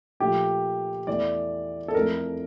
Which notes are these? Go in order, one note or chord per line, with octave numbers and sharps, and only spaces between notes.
A#2 F3 A3 G4
E2 E3 A3 D5
A4
F2 E3 A3 A#4